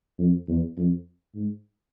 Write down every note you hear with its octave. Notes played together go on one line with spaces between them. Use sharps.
F2
E2
F2
G#2